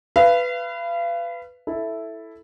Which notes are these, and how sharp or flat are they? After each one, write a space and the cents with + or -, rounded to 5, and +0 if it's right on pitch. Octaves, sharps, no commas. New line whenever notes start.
B4 +10 F5 -35
E4 +0 A4 +0